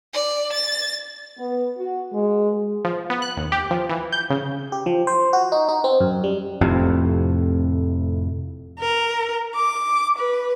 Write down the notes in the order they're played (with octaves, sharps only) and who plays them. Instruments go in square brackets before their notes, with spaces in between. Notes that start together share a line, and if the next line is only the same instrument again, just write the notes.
[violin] D5
A6
[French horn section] B3
F#4
G#3
[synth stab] F3
B3
F#6
D#2
G4
F3
E3
G6
C#3
[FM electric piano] G4
F3
C5
F#4
D#4
D#4
C4
F#2
G3
[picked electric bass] F1 F2 A2 C3
[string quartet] A#4
D6
B4